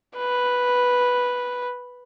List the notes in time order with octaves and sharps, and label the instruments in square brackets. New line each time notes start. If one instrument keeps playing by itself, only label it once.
[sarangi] B4